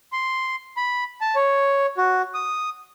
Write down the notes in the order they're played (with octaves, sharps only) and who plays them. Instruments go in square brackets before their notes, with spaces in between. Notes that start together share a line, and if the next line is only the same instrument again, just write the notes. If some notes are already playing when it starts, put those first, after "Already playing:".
[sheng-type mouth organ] C6
B5
A5
C#5
F#4
D#6